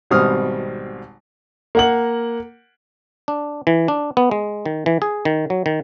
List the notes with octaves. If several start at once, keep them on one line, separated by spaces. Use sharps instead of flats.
G#1 B2 G3 C4 D#6 F6
A#3 F#5 F#7
D4
E3
D4
B3
G#3
D#3
E3
G#4
D#3
F#3
D#3